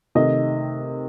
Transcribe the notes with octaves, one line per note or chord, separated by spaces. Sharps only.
C3 D#3 A3 D#5